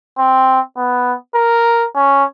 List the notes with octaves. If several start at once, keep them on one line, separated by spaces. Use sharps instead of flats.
C4
B3
A#4
C#4